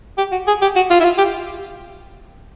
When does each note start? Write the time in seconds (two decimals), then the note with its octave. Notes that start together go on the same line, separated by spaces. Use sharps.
0.17 G4
0.32 F#4
0.47 G#4
0.61 G4
0.75 F#4
0.90 F4
1.00 E4
1.04 F4
1.18 G4